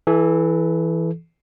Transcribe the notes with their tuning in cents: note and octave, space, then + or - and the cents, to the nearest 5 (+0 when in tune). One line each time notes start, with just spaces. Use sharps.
E3 +0 A4 -35